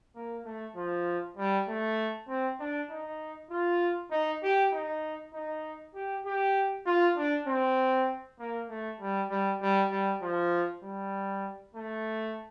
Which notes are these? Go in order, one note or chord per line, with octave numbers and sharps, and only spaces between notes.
A#3
A3
F3
G3
A3
C4
D4
D#4
F4
D#4
G4
D#4
D#4
G4
G4
F4
D4
C4
A#3
A3
G3
G3
G3
G3
F3
G3
A3